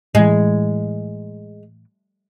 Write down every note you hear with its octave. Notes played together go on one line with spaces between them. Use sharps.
A2 E3 G#3